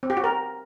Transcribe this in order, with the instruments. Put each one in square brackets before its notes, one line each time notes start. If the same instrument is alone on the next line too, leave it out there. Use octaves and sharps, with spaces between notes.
[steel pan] C4
G4
F#4
A#4